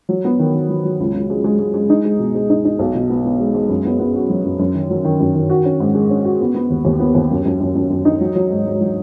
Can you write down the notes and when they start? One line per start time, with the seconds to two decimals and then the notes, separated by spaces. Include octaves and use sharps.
0.09 F#3
0.25 B3
0.39 D#3
0.54 D#3
0.69 F#3
0.84 F#3
1.00 C#2
1.14 C#2
1.30 G#3
1.44 G#3
1.59 G#3
1.74 G#3
1.90 D#4
2.05 G#3
2.19 B2
2.35 G#3
2.50 D#4
2.65 D#4
2.79 B1
2.95 B2
3.10 B3
3.25 B3
3.40 G#3
3.54 G#3
3.69 F#2
3.85 B3
4.00 B3
4.15 F#4
4.30 F#3
4.44 F#2
4.59 F#2
4.75 D#3
4.90 F#3
5.05 D#3
5.20 F#2
5.35 D#3
5.50 F#4
5.65 C#4
5.80 G#2
5.94 G#3
6.10 C#4
6.25 F#4
6.41 B3
6.55 B3
6.70 D#2
6.85 D#2
7.00 B3
7.15 D#2
7.31 F#2
7.46 F#2
7.61 F#2
7.75 F#2
7.90 F#2
8.05 D#4
8.21 F#3
8.35 F#3
8.50 G#2
8.66 G#2
8.81 F#3